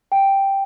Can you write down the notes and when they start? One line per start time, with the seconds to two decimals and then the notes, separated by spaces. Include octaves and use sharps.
0.12 G5